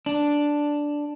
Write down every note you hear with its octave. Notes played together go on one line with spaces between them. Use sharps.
D4